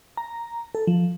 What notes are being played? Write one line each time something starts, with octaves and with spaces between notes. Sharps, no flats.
A#5
A4
F3